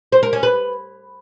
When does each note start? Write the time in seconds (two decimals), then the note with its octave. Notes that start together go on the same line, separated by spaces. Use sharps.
0.12 C5
0.23 A#4
0.33 C#4
0.43 B4